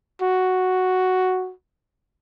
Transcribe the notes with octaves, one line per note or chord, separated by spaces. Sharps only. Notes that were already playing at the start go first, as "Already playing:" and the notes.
F#4